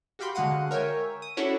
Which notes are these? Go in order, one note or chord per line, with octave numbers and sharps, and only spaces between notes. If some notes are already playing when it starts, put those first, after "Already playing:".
F#4 G4 F5 G5 B5 C6
D3 G#3 F#4 F5 F#5 D#7
A#4 C#5 E5 G5 G#5
D#6
C#4 D4 E4 F#4 A4 C#5